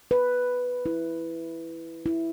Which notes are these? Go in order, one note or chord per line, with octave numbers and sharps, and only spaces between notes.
B4
E4
E4